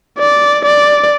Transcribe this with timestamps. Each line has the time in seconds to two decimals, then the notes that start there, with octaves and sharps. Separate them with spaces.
0.19 D5
0.65 D5